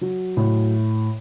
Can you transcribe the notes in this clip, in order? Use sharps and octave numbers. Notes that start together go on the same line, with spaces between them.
F#3
A2